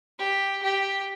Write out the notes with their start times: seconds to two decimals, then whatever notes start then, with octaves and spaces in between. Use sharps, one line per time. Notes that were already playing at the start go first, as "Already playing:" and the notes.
0.19 G4
0.63 G4